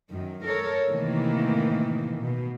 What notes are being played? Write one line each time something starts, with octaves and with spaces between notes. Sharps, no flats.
F#2 D#3
A4 A#4 C#5
A2 C3 D#3 E3 A#3
B2